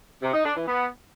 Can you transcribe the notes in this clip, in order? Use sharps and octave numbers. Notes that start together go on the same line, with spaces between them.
C3
D#4
D4
E3
B3